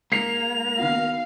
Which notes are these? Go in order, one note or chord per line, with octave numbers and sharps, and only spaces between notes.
G#2 A#3 C7 F7
D#3 B3 F#4 F5